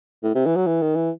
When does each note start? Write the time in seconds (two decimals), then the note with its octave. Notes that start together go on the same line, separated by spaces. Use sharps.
0.23 A2
0.35 C3
0.46 E3
0.56 F#3
0.67 E3
0.82 D#3
0.95 E3